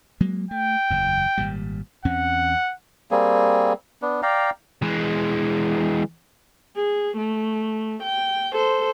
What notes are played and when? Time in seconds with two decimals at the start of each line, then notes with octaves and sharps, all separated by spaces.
0.21 F#3 G#3 A#3
0.51 A3 G5
0.90 F#1 E2
1.38 G#1 A#2 G3
2.05 E2 C4 C#4 F#5
3.11 G3 A#3 C4 G#4
4.02 B3 D4
4.23 D5 F5 G5 A#5
4.82 E3 G#3
6.76 G#4
7.17 A3
8.03 G5
8.53 A4 C5